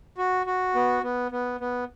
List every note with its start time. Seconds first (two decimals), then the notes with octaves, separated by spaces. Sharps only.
0.18 F#4
0.46 F#4
0.75 B3
1.03 B3
1.31 B3
1.60 B3